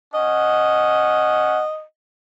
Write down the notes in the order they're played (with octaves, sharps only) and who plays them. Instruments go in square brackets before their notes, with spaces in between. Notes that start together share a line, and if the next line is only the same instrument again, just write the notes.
[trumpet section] C#4 F#5 [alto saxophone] D#5